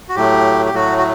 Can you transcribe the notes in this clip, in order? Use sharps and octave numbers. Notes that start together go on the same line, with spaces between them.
F#4
A2 F#3 A3 G4
G4
A2 F#3 A3 F#4
F#4